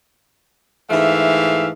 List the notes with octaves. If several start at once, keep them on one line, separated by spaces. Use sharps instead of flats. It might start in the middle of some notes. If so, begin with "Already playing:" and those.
G#2 E3 A3 E5 F5